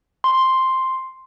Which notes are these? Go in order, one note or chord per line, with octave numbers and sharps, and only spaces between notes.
C6